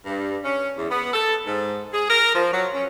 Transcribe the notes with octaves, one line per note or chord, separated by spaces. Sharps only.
G2
C#4
E2
B3
A4
G#2
G#4
A#4
F3
F#3
C#4